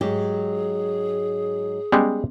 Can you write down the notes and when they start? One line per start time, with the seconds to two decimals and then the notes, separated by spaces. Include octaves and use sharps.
0.01 G#2 F#3 G4 G#4
1.92 G3 G#3 B3 C#4 F#6